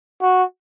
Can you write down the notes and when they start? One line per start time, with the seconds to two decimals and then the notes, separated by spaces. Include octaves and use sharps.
0.22 F#4